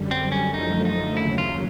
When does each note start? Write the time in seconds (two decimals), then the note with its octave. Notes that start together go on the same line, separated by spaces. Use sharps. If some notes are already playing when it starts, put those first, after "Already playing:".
Already playing: F#2 D3 G3
0.11 C4
0.32 C#4
0.54 F#2 D3 F3 A3 D#4
0.85 D#4
1.17 D#2 C#3 F#3 E4
1.38 F4